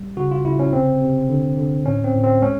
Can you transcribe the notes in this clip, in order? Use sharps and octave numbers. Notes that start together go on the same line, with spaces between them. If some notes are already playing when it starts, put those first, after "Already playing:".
Already playing: G3
C#3 F#4
F4
C#3 E4
C#4
C3 C4
C3
D3
D3
A2 C#4
C4
A2
C4
G#3 C#4